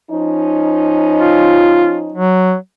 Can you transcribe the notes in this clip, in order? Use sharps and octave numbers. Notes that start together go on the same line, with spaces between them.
F3 C#4 D#4
F4
F#3